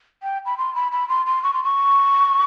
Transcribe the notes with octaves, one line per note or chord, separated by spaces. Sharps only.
G5
B5
C6
B5
B5
C6
C6
C#6
C6
C#6